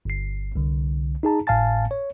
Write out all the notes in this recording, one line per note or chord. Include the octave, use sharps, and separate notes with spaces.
G1 C7
C2 D3
D#4 G#4 A5 A#5
G#1 A2 F5 G#5 A5 A6
C#5